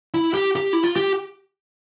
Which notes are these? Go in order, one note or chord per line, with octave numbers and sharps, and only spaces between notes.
E4
G4
G4
E4
F4
G4